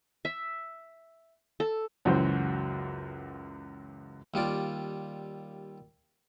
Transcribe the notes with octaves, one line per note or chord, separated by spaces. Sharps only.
E5
A4
C#2 F#2 E3 F#4 C5
D#2 G3 F4 D5